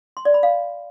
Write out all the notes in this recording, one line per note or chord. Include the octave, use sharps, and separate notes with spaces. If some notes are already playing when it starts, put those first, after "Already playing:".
C6
D5
B5
F5